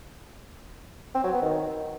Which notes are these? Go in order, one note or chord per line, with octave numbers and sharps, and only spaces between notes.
C4
F#3
B3
D#3